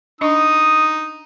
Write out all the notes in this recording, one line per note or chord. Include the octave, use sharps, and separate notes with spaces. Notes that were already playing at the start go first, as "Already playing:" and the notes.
D4 D#4 D#5 C#6 D#6